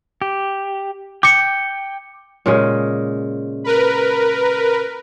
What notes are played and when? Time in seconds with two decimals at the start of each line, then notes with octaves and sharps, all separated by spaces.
0.22 G4
1.23 G5 D6 C#7
2.46 A#2 C#3 G#3
3.64 A#4 B4